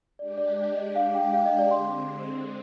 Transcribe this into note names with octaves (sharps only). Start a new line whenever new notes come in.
G#3 D4 G4 D5
D5
D5
D#5
F5
G5
F5
D#5
D5
D3 G#3 C4 C6